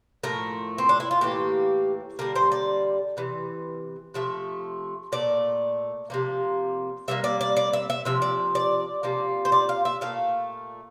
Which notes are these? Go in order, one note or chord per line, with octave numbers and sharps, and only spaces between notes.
A2 F3 A3 A#4
C4
D4
E4
F4
A2 E3 A#3 G4
D3 G3 A#3 A#4
C5
D5
C3 E3
C3 F3 A3 E5
A#2 A3 D5
C3 F3 A#3
C3 G3 A#3 E5
D5
D5
D5
E5
E5
C3 F3 E5
D5
D5
C3 F3 A#3
C5
D5
F5
E5
A#2 A3 F5